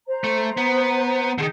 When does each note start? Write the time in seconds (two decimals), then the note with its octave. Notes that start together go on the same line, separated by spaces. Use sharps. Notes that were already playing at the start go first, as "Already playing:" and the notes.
0.07 C5 A#5
0.24 A3
0.57 B3
1.38 D3 D#3 G#4 G6